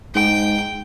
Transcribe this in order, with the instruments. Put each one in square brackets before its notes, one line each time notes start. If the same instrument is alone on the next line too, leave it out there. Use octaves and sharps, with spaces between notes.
[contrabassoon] G#2 [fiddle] G5